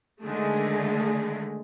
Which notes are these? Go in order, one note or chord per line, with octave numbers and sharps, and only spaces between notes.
D3 D#3 G#3 A3